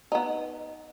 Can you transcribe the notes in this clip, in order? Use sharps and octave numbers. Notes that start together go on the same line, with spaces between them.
B3 D#4